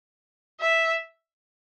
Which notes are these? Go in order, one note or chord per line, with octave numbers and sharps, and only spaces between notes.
E5